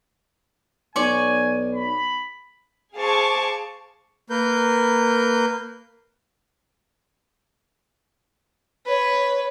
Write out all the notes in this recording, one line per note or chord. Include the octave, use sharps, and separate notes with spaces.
B1 C#5 D5 G#5 C#6
B5
G#4 C5 F5 A5 C#6 D6
A#3 A#4 B4 G6
B4 C#5